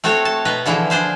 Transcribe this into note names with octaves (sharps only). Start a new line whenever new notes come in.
A3 C4 F#4 A4 C#5
A5
B2 B4 D#5 A#5
D3 E3 F3 E4 G#4
D4 G#4 C5 F5